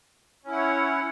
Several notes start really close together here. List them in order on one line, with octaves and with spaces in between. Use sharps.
C#4 E4 F#5 C#5